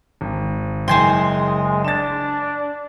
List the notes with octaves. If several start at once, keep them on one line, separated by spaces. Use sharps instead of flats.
G#1
F#1 G#3 C5 G5 G#5 C6 G6
D4 A6 E7